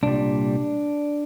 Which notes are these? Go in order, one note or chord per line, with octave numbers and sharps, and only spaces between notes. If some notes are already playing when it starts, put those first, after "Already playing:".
C2 A#2 G3 D4